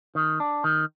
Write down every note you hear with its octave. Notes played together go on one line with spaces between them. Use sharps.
D#3
D4
D#3